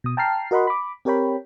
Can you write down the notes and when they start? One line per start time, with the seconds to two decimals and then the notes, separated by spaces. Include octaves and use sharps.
0.04 B2 D#6
0.17 G5 A5 A#5 F6 C7
0.51 F#4 A#4 D#5 F#5 B5 C6
0.67 B5 D6
1.05 C4 G4 A#4 C#5 G5 B5